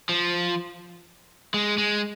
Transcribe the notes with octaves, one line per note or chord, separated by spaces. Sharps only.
F3
G#3
G#3